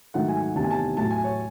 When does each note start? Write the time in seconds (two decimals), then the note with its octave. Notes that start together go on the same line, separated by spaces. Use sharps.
0.14 G#2 D#3 F#3 A3 F#5
0.28 G#5
0.42 G#5
0.56 E2 C3 D#3 A3 A5
0.64 G#5
0.71 A5
0.97 A2 F#3 A3 A5
1.11 G#5
1.24 C#5